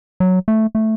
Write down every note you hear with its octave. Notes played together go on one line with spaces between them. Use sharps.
F#3
A3
A3